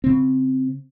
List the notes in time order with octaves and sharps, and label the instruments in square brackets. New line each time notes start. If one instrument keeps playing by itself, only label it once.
[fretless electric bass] C#3 C4